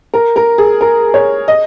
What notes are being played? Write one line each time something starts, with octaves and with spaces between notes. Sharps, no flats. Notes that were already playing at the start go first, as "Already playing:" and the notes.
A#4
A#4
G#4
A#4
C#5
D#5